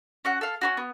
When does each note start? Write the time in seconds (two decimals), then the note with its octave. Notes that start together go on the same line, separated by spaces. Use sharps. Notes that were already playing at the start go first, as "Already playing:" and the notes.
0.25 C#4 F#4 F#5
0.41 A4 F5
0.61 C#4 E4 F#4
0.77 B3